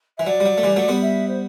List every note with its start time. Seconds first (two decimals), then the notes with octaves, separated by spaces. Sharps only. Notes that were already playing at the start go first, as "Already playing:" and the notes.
0.18 E3 E5
0.26 F#3 D5
0.40 G3
0.46 F#3
0.58 A3
0.63 E3 G3
0.76 F#3 A3
0.88 G3 B3
1.02 E5
1.28 C5